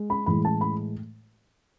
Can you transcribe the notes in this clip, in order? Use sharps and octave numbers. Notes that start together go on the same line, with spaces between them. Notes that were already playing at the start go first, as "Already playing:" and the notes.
Already playing: G#3
B5
A2 E3 G#3 B5
A5
B5